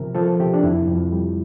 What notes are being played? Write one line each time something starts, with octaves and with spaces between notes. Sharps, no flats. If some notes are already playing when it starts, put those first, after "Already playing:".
Already playing: C3 F3 A#4
F3 A4
C3 G4
D4
F2 E4
F2
G3